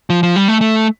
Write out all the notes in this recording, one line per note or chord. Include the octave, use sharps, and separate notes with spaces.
F3
F3
G3
A3
A3